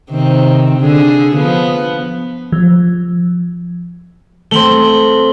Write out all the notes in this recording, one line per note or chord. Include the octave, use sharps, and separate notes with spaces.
C3 D#3 C4
D3 G#4
F3 B3
F3
A3 C4 C6 F#7 G7